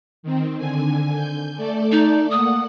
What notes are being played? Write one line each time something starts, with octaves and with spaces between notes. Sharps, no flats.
D#3 C4
D3 G#5
G6
A3 A4 D5
D#4
A#3 F#5 D#6